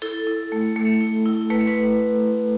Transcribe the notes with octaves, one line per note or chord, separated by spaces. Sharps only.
E4 A4
E4
A3
A3
E4
E4
A3 B4
B4